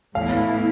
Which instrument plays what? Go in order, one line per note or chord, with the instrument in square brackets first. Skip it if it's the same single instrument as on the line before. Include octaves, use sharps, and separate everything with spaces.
[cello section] A2 E3 B3 E4 [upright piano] F5